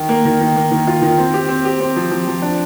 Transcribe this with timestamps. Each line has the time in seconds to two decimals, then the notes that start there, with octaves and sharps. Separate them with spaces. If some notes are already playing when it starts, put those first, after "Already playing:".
Already playing: D#3
0.09 A#3
0.25 D#3
0.41 D#3
0.56 A#3
0.71 D#3
0.87 F4
1.02 D#3
1.18 C4
1.34 G4
1.49 C4
1.65 G4
1.80 C4
1.96 F3
2.11 F3
2.28 F3
2.42 D4